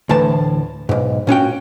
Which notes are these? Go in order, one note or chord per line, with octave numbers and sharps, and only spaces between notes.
D2 A2 E3 A5
B1 G#2
A#2 C#4 F#4 G5